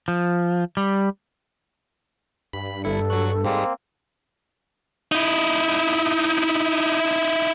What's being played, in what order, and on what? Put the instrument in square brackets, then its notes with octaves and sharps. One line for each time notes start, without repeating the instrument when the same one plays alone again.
[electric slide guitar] F3
G3
[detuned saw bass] G2 [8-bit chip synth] B5
[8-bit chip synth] G1 E4 C#7 [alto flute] A4
[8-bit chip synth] F#3 F#6 [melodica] C#6
[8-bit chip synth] G#2 G3 G#3 [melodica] A#3 C4
[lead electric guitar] D#4 E4